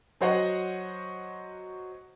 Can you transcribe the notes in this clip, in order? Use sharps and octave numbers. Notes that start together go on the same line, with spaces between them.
F#3 F#4 C5 C#5 D#5 F#5